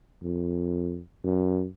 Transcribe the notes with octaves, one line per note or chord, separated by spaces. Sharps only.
F2
F#2